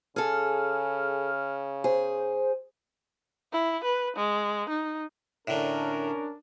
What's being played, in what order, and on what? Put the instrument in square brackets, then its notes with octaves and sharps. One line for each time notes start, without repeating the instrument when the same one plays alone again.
[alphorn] C#3 [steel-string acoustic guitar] G#4 A4 [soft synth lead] F6
[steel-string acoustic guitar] G#4 [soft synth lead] C5
[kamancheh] E4
B4
G#3
D#4
[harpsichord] A2 D3 [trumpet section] C#4 A#4 [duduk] D4